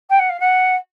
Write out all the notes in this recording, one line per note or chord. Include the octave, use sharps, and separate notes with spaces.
G5
F#5
F5
F#5